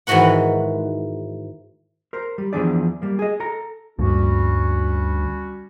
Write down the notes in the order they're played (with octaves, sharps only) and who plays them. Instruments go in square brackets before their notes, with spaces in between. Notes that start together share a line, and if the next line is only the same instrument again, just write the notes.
[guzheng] G#2 D#3 E3 F#4 B4 F#5
[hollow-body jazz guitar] A#4 C5
G3
E2 G2 F3 D4 G#4 D5
G3 A#3
G#4 D#5
A4 A#5
[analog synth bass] D2 [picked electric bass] G2 A#2 D3 [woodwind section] G3 C#4 F#4